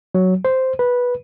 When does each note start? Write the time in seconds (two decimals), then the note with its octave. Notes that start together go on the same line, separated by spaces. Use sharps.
0.15 F#3
0.45 C5
0.79 B4